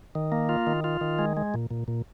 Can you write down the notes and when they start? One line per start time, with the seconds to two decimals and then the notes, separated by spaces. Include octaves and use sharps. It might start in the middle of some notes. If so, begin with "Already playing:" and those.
0.15 D#3
0.32 A#3
0.49 F4
0.67 D#3
0.84 F4
1.01 D#3
1.19 G#3
1.37 G#3
1.54 A#2
1.71 A#2
1.88 A#2